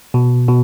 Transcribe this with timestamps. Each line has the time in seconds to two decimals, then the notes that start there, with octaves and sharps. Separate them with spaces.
0.14 B2
0.48 B2